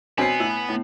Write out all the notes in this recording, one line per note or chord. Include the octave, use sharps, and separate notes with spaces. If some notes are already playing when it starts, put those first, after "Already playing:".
B2 B3 C4 C#5 G#5 C7
A2 E4 E6
A2